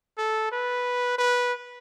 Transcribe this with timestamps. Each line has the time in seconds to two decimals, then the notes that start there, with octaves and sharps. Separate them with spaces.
0.18 A4
0.52 B4
1.18 B4